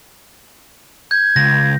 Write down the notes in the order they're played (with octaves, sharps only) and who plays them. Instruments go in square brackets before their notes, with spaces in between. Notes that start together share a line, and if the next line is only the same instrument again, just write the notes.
[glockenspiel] G6 [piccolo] G#6
[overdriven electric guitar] C#2 [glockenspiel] A#6